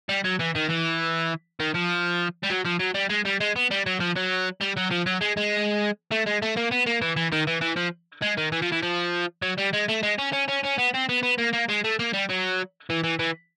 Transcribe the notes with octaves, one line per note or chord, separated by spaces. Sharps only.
G3
F#3
E3
D#3
E3
D#3
F3
G3
F#3
F3
F#3
G3
G#3
G3
G#3
B3
G3
F#3
F3
F#3
G3
F#3
F3
F#3
G#3
G#3
A3
G#3
A3
A#3
B3
A#3
E3
E3
D#3
E3
E3
F3
G#3
D#3
E3
F3
E3
F3
F#3
G3
G#3
A3
G#3
C#4
C#4
C#4
C#4
B3
C4
B3
B3
A#3
A#3
G#3
A3
A#3
G3
F#3
E3
E3
E3